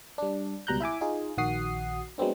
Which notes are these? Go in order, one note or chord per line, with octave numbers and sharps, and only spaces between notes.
G3 D4
C#2 B2 G3 A#5 F#6 G6
E4 E5 G#5 D6
D#4 F4 G#4
A#1 D#3 F#4 F#5 D#6 C7
F#3 G#3 B3 C4 D4